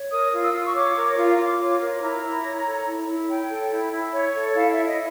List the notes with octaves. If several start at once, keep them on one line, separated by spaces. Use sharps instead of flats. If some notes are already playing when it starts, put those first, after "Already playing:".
Already playing: C#5
A#4 D#6
F4
E6
F4
C#6
C#5 D6
A#4
F4
F4 D6
C#5
A#4
E4 A#5
E4
C#5
A4
E4
E4
C#5 G5
A4
E4
E4
C#5
A4
E4 F5
E4 E5
D#5